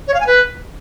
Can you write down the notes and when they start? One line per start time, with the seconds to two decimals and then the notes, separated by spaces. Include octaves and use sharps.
0.08 C#5
0.14 F5
0.20 G#5
0.27 B4